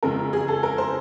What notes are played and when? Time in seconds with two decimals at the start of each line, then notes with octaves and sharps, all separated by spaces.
0.03 F2 C#3 E3 G#3 B3 A#4
0.33 G#4
0.48 A4
0.63 A#4
0.78 C5